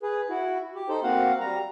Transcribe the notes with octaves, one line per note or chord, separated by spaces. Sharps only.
G#4 B4
E4 F#4
G4
D#4 A4 C5
A#3 C4 F#4 F5 F#5
G3 A#5